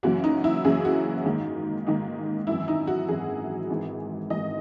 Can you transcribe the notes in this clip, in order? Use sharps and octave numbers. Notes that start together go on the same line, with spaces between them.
F#2 C#3 E3 A#3 C#4 F#4
D#4
E4
F#2 C#3 E3 A#3 C#4 G#4
F#4
G#2 D#3 A#3 D#4
G#2 D#3 A#3 D#4
G#1 F#2 E3 E4
D#4
F#4
G#1 F#2 E3 G#4
G#1 G#2 E3
G#1 G#2 E3 D#5